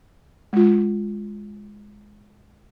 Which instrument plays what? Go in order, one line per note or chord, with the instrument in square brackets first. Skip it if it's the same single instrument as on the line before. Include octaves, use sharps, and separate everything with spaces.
[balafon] G#3 F4